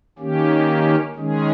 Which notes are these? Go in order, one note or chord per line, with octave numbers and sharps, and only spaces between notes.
D#3 A#3 C#4 G4
D#3 G#3 C#4 G#4